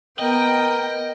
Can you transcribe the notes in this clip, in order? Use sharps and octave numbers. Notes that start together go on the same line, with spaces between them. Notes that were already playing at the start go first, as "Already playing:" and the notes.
B3 A#4 D#5 G5